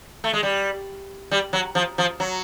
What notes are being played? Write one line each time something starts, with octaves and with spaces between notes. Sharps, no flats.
A3
G#3
G3
G3
F#3
F3
F3
F#3